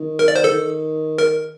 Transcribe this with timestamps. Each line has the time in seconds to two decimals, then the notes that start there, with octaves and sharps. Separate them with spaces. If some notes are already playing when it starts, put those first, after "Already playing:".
Already playing: D#3
0.19 A#4
0.28 D5
0.36 C5
0.44 A4
0.52 D#3
1.18 A#4